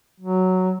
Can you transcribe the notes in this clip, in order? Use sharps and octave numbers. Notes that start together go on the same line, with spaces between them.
F#3